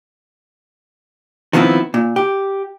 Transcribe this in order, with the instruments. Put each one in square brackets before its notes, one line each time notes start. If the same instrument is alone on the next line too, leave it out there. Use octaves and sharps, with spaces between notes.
[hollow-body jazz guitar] D#3 F3 A3 B3 C4 E4
A#2
G4